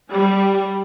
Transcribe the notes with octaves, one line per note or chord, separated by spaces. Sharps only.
G3